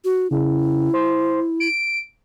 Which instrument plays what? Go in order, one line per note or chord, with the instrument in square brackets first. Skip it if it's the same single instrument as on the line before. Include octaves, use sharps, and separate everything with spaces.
[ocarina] F#4
[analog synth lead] C#3 [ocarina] E4
[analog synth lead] C5
D7